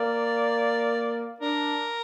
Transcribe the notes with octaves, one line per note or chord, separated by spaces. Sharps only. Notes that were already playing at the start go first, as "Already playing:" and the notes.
Already playing: A#3 D5
D4 A#4